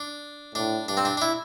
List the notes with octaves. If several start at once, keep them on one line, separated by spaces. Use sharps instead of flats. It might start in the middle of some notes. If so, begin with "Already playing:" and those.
Already playing: D4
A2 D4
G2 D4
C4
D4
D4
E4